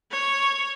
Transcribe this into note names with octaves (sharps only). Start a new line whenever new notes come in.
C#5